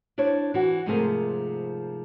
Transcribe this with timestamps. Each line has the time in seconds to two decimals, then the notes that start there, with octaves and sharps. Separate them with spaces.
0.18 D4 E4 C5 C#5
0.54 E3 F#4
0.86 G#2 C3 F3 A3 G#4 A#4